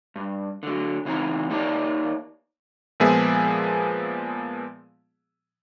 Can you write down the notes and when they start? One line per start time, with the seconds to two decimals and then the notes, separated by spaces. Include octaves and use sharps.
0.16 G2
0.63 D3 F#3
1.05 C#3 E3 C4 D#4 A#5
1.50 A#3 D#4 G4 C#5 D5 A5
3.00 A#2 F3 G#3 B3 G#4 E5